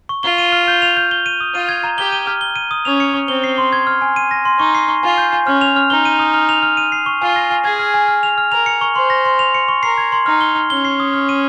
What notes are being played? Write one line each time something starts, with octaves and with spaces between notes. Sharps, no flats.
C#6
F4 G7
D#7
F6
G6
F7
G6
G7
D#7
D#6
F4 D#7
G#6
A#5
G4 G7
D#7
F6
G7
D#7
D#6
C#4 F7
C#7
C#6
C4 G7
C7
C6
G#6
F6
G#5
D#7
A#6
C6
D#4 C#6
C7
C#6
F4 G#5
G6
G#5
C#4 F6
F7
F6
D#4 G7
D#7
D#6
F6
F7
F6
D#7
C7
C#6
F4 G#5
A#6
G#5
G#4 G#6
F6
G#5
F6
F7
F6
A#4 F7
C#7
C#6
C5 C6
A#6
C6
F7
C#7
C#6
A#4 C7
G#6
C6
D#4 F6
G7
F6
C#4 G7
C7
D#6
F6
D#7